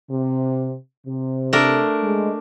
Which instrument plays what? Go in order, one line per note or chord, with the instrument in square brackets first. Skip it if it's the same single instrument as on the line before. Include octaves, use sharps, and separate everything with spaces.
[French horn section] C3
C3
[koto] A3 D4 A#4
[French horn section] G#3